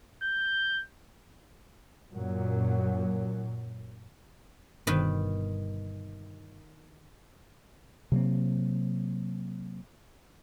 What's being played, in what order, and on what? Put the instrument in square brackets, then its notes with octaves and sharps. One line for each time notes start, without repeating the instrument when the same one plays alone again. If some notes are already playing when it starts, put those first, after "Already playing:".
[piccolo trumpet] G6
[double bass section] F#2 A#2 F#3
[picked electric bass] G1 G2 B2 [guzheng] D#3 B4
[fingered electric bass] C3 F#3 A#3 C4